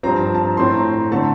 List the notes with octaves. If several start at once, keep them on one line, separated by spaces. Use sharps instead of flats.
G2 F3 C4 A#5
A5
A5
A#5
A2 A3 C4 C6
A#5
A#5
D3 A3 C4 A5